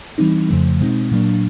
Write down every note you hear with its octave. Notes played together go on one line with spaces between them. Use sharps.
E3 G3 C4 D#4
F2 C#3 F3 A3
B2 G#3 C4 D#4
A#2 F#3 A#3 D4